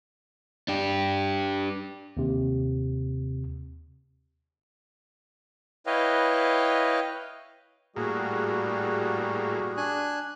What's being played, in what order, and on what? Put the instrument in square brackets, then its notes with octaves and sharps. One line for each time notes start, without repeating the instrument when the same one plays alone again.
[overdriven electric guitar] D4 G4
[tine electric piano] D#2 C3
[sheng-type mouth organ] E4 B4 C#5 D#5 F5 G5
[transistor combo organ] A2 A#3 [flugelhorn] G3 [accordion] F#4 G#4
[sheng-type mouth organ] D4 G#5 F#6